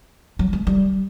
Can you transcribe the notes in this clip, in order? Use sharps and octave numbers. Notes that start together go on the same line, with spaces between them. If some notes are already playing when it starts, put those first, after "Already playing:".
F#3
G#3
G3